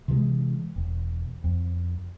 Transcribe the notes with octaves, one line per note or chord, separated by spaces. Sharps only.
C3 E3 F3 G#3
E1
F2